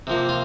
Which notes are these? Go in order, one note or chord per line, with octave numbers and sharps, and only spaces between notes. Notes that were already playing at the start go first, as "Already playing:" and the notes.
C3 F3 A#3
F4